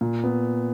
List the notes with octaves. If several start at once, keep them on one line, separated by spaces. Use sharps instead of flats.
A#2
B3